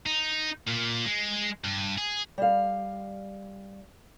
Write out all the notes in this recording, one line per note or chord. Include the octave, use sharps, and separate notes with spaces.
D#4
A#2
G#3
G2
G#4
G3 F5